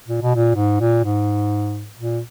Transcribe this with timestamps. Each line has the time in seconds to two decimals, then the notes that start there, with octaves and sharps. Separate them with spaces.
0.08 A#2
0.22 B2
0.35 A#2
0.56 G#2
0.80 A#2
1.04 G#2
1.99 A#2